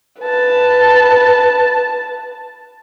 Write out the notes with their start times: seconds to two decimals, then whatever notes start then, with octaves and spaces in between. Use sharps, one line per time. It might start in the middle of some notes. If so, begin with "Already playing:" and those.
0.21 B4 A5